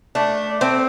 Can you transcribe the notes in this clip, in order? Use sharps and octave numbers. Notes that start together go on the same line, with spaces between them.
A3 D4
A3 C4